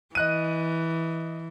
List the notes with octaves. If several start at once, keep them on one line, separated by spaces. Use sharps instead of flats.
E3 D#5 F#6 D#7